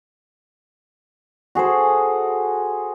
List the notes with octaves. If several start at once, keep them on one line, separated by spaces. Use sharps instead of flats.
F#4 G#4 A4 C5